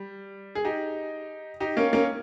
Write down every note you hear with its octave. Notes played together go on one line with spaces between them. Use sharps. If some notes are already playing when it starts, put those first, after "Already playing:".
Already playing: G3
G#4
D#4 G4
D#4 G4
A#3 C#4
A#3 C#4